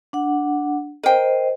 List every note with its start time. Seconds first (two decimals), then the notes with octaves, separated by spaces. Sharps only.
0.13 D4 F#5
1.04 A#4 C5 D#5 G5